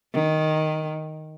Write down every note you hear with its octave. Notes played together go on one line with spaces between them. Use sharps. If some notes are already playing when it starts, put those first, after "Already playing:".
D#3